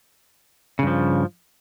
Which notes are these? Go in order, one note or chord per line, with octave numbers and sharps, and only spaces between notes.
G2 C#3 F3